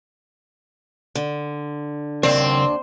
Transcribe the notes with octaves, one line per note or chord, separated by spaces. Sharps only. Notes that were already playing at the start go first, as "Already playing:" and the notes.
D3
D#2 C#3 C4 D4 A#4